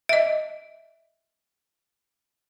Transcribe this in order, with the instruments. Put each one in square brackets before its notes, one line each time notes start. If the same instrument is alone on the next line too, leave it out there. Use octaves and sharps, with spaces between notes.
[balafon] D#5 E5